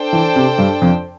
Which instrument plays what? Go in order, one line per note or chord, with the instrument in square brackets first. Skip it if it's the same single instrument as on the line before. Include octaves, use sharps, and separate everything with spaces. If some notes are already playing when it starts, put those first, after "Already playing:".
Already playing: [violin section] D4 A4 C5 G5
[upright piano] E3
C3
G2
F2